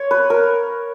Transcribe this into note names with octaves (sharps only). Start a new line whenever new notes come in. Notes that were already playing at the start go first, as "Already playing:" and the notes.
Already playing: C#5
B4
A#4